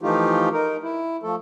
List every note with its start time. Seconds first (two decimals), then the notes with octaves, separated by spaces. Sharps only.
0.01 E3 F3 A3 D#4 F4 G4
0.53 D#4 A#4
0.83 E4
1.23 F3 A3 A4